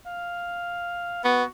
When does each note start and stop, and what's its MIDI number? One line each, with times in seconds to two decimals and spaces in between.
0.06 1.20 77
1.24 1.44 59
1.24 1.46 66